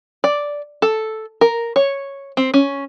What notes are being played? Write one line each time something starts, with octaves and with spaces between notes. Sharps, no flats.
D5
A4
A#4
C#5
C4
C#4